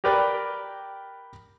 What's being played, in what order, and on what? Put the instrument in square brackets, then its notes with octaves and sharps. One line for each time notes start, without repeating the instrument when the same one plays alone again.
[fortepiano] G4 A#4 B4 D5 G5